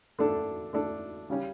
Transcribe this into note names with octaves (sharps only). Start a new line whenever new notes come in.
D3 A3 D4 A4
D3 A3 D4 A4
C#3 G3 C#4